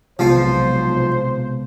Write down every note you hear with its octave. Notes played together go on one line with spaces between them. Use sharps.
B1 C3 F3 G#3 B3 F4 C5